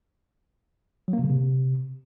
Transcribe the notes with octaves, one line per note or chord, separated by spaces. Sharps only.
F#3
A#3
C3
C#3
C3